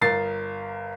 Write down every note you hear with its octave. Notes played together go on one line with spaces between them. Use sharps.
G1 A#4 A6 C7